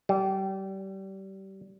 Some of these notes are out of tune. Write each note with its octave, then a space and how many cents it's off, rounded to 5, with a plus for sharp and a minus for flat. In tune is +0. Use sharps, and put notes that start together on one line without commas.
G3 -30